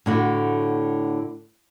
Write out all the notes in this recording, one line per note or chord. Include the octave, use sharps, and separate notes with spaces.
A2 D3 F#4